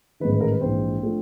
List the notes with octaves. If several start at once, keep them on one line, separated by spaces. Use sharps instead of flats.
A1 G#2 D#3 B4
B4
A#4
B4
A#1 G#2 E3 C4 C5
F3 A3 D4